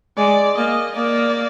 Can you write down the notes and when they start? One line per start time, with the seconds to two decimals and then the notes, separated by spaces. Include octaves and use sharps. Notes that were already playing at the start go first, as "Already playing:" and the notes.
0.17 G#3 D5
0.57 A#3 D#5
0.96 A#3 D5